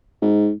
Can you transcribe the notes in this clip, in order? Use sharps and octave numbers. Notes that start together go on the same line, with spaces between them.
G#2